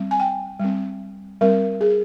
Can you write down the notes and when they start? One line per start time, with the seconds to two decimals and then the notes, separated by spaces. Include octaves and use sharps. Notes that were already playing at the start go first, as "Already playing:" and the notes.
Already playing: G3 C4
0.11 G#5
0.20 G5
0.60 G3 C4
1.41 G3 C4 A#4
1.81 G#4